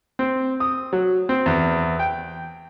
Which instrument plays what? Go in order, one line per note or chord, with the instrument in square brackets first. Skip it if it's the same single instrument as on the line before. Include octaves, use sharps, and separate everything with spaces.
[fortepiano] C4
D#6
F#3
C4
E2
G5